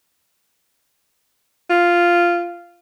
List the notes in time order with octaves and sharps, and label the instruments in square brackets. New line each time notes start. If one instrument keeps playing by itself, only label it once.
[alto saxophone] F4